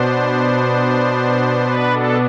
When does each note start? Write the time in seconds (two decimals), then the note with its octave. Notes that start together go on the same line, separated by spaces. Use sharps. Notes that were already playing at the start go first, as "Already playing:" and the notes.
Already playing: B2 B3 D4 C5
1.64 B4
1.93 A4